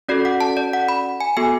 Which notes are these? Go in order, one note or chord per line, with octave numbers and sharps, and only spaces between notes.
C#4 F#4 A4 D5
F#5
A5
D5
F#5
B5
G#5
B3 F#4 A4 G#5